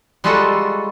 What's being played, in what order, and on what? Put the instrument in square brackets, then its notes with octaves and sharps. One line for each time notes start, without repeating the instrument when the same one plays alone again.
[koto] G3 G#3 F4 F#4 A4